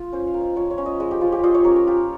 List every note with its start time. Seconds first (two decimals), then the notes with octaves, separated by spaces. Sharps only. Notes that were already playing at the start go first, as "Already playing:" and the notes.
Already playing: F4
0.12 C#4 C5
0.27 F5
0.34 A#3
0.41 D#5
0.56 F3 C#5
0.71 C#5
0.78 C#4
0.86 D#5
1.00 G#3 D#5
1.11 G4
1.21 F3 F4
1.32 G4
1.43 F4 D#5
1.54 C#5
1.65 C#4 A#4
1.76 A#4
1.87 F4 G4